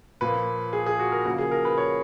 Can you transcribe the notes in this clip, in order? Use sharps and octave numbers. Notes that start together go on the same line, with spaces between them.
A#2 F3 A#3 B4
G#4
G#4
F#4
A#4
C#3 F3 A#3 F#4
G#4
A#4
B4
C#5